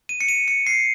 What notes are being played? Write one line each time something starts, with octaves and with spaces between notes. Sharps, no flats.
D#7
C#7
D#7
C#7
C7